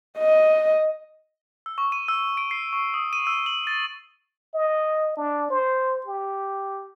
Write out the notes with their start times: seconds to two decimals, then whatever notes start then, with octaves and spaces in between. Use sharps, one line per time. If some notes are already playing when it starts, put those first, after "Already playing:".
0.18 D#5
1.66 E6
1.78 C#6
1.92 D#7
2.08 E6
2.37 D7
2.51 C7
2.73 C#6
2.94 D#6
3.13 D#7
3.27 E6
3.46 F#7
3.67 A6
4.54 D#5
5.17 D4
5.50 C5
6.06 G4